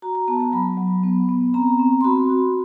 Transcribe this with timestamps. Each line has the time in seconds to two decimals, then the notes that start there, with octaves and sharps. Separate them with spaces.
0.02 F#4 A#5
0.15 A#5
0.28 B3 A5
0.40 A#5
0.52 F#3 B5
0.78 F#3
1.04 B3
1.29 B3
1.54 C4 A#5
1.79 C4
2.01 C6
2.04 F#4 B5
2.30 F#4